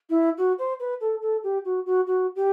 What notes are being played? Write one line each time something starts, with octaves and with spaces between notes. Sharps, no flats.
E4
F#4
C5
B4
A4
A4
G4
F#4
F#4
F#4
G4